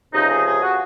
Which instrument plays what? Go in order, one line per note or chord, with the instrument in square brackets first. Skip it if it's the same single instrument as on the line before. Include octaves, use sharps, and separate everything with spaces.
[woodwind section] C#2 C3 F3 D#4
G#4
G#4
F#4